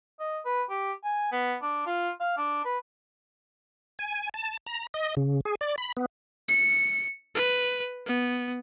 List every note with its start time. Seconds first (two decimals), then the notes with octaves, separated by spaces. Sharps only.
0.20 D#5
0.45 B4
0.70 G4
1.04 G#5
1.32 B3
1.62 D4
1.86 F4
2.20 F5
2.37 D4
2.65 B4
3.99 G#5
4.34 A5
4.66 A#5
4.94 D#5
5.17 C#3
5.45 G#4
5.61 D5
5.78 B5
5.97 B3
6.48 C#7
7.35 B4
8.06 B3